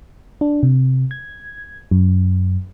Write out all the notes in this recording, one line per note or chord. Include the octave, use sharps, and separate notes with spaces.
D4
C3
G#6
F#2